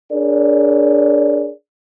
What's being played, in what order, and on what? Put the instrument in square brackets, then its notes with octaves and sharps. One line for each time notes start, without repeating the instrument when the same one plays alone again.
[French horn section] D4 G#4 A#4 C#5 D5